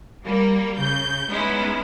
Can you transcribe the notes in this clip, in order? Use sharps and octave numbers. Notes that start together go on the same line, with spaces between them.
G3 A#3
C#3 G6
G#3 B3 C#4 D#4 E4